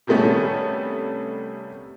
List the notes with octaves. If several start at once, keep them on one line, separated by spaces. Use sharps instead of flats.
C3 D#3 G3 A3 B3 C#4